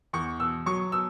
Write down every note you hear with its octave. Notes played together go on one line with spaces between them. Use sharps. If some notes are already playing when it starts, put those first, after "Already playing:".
E2 C#6
B2 E6
F#3 C#6
B2 E6